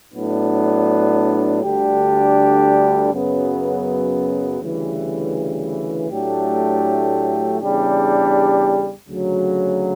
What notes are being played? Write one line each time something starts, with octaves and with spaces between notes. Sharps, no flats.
A2 F#3 B3 D4
D2 D3 G3 D4 G4
F#2 C#3 F#3 B3
D2 C#3 E3 G3
A2 F#3 A3 D4 G4
E2 C#3 G3 D4 G4
D2 C#3 F#3